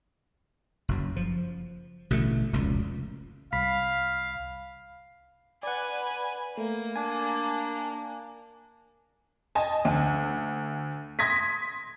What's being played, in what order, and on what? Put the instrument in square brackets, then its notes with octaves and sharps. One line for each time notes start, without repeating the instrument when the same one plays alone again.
[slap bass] F#1 F#2
F3
A1 B2 D3 A3
F1 C#2 A#2
[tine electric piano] C2 B5 B6 [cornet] F5
[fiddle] B4 G#5 [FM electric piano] D5 F#5
[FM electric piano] A3 [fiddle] A#3
[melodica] D4 [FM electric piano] G#5
[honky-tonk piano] D#5 G#5 A5
D2
C6 D#6 G#6 A#6 B6